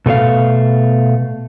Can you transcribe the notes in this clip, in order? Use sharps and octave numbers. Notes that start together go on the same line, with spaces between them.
B2 A3 C#5 F5